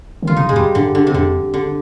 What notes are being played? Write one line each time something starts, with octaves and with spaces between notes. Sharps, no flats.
D#3
D3 F4
C3 D#4
G2 G#3
F2 G3
G2 D3
D3
C3
F2 D3
D3